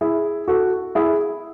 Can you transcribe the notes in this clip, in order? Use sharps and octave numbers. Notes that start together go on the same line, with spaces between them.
E4 G#4
F#4 A4
E4 G#4